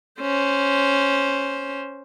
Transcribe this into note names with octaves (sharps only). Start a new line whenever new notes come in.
C#4 C5